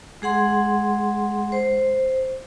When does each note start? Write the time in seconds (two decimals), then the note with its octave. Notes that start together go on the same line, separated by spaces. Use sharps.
0.22 G#3 G#4 F#5 C6
1.52 C5